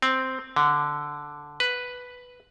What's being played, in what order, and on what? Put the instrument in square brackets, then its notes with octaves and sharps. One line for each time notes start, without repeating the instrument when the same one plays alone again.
[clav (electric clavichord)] C4
D3
B4